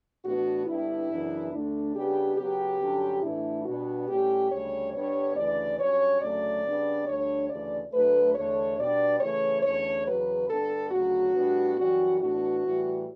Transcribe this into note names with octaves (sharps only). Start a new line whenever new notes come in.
A2 E3 B3 D4 F#4
G2 D3 G3 B3 E4
F#2 C#3 E3 B3 D4
D2 D3 A3 D4
C#3 G3 B3 D4 G4
C#3 F#3 B3 G4
G2 D3 F#3 C#4
A2 E3 A3 D4 E4
B2 G3 B3 D4 F#4
A2 G3 C#4 G4
D2 C#3 G3 C#5
G2 D3 G3 B3 D4 C#5
D2 C#3 E3 D5
G2 F#3 C#4 C#5
D2 C#3 F#3 A3 C#4 D5
C#3 G3 B3 D4
D2 D3 G3 D4 C#5
D2 C#3 E3 D5
D2 D3 F#3 A3 B4
E2 D3 A3 D4 C#5
B2 G3 B3 D4 D5
C#3 E3 A3 C#5
E2 D3 A3 C#4 C#5
E2 C#3 F#3 B4
G2 D3 G3 B3 A4
D2 C#3 F#3 F#4
A2 G3 B3 D4
F#2 E3 G3 C#4 F#4
A2 E3 B3 D4 F#4
A2 E3 G3